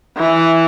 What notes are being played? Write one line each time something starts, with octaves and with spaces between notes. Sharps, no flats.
E3